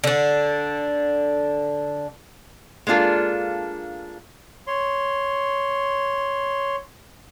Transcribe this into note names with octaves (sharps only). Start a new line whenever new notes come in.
D3 D4
G#3 A#3 D4 F4 A4
C#5 C6